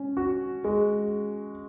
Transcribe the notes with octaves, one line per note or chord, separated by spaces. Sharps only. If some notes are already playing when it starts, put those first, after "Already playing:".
Already playing: C#4
F#4
G#3